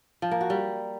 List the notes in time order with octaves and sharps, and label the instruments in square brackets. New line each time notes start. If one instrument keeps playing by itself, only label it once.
[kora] F3
A#3
F#4
G3